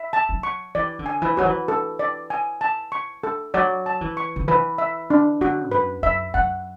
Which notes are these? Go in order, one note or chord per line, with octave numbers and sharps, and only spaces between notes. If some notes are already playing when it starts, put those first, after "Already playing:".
Already playing: E5
A5
F#3
C#6
E3 D5
D3
G#5
E3
F#3 F#4
E3
A4
D5
G#5
A5
C#6
A4
F#3 D5
A5
E3
C#6
D3
E3 B4
E5
D4
D3 F#4
F#2 B4
F#2 E5
F#2 F#5